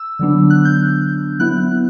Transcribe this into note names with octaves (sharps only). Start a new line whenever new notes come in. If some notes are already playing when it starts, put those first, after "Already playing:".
Already playing: E6
D3 F#3 B3 D4
F#6
G6
F#3 B3 E4 F#6